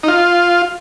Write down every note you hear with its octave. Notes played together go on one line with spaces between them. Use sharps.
D#4
F4